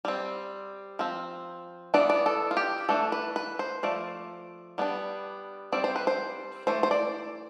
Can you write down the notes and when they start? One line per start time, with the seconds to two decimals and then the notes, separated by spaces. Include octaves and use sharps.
0.05 G3 C4
0.99 F3 C4
1.94 E3 B3 D4 D5
2.10 D5
2.26 A4
2.51 F4
2.57 G4
2.89 E3 A3 D4 A4
3.12 B4
3.36 B4
3.59 C5
3.83 F3 A3 D5
4.78 G3 B3 D4
5.72 G3 C4 D5
5.84 C5
5.96 B4
6.07 C5
6.67 E3 A3 C5
6.83 C5
6.91 D5